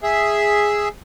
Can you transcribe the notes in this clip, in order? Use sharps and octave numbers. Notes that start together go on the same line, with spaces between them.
G#4 E5